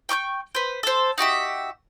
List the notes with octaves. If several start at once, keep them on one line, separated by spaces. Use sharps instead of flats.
G5 C#6 D6 G6
B4 C5
A4 C5
D#4 F#4 G4 E5